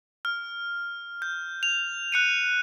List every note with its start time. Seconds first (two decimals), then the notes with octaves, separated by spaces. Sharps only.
0.25 F6
1.22 G6
1.63 F7
2.12 F#6 C#7 D#7